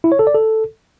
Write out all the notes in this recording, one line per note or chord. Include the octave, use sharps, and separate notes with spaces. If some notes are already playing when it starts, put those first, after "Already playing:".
E4
C#5
A4
D5
A4